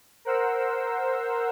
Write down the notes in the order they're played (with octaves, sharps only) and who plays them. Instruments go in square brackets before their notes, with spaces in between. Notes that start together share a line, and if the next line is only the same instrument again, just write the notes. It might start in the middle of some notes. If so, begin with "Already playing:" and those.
[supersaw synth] A#4 C5 F#5 E6